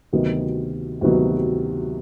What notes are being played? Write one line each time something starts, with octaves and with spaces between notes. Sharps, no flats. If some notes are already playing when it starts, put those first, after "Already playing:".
D2 C3 D#3 F#3 B3
D2 C3 D#3 F#3 B3